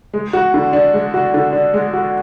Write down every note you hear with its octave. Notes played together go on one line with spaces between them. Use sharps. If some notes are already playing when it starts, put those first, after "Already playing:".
G#3
F#4
D3
D4
G#3
F#4
D3
D4
G#3
F#4